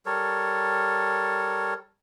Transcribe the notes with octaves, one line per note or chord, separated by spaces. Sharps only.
G3 A4 A#4 C#5